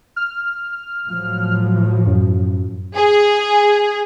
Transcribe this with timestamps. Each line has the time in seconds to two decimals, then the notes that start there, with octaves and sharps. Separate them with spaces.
0.16 F6
1.07 A2 F3 F#3
2.07 F#2
2.95 G#4